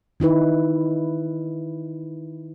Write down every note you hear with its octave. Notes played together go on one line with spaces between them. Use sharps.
D#3 D#4 E4 B4